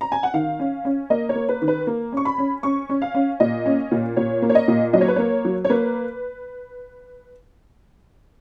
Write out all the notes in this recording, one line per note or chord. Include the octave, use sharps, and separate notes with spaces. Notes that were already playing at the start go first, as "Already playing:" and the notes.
A#5
G#5
F#5
D#3 F5
C#4
C#4
A#3 D#5
C#5
A#3
B4
D#3
B4
A#3
C#4 C#6
B5
C#4
C#4 C#6
C#4
F5
C#4
A#2 D#5
C#4
A#2
A#2 C#5
A#3
C#5
D#5
A#2
F#3 D#5
C#5
B4
A#3 C#5
F#3
C#5
A#3 B4